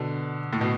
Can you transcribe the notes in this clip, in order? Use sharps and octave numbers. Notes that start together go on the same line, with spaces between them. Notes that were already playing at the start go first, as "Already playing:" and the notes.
Already playing: B2 D3
A2
B2